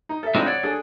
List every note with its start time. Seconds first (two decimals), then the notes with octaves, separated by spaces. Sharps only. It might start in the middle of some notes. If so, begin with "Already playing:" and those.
0.09 D#4
0.23 A4 E5
0.35 C#3 F3 G#3 C4 D4 D#4
0.46 C#5 D5 F#5
0.63 D4 G#4 A4